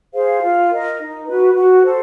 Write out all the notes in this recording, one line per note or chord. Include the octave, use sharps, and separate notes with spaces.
G#4 C5 F5
F4
A#4 D#5
D#4
F#4 B4
F#4
A4 C5